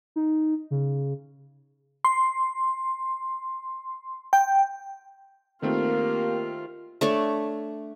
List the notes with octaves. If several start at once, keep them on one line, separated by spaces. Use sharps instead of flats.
D#4
C#3
C6
G5
D#3 A3 A#3 C4 F4 G4
A3 D4 C#5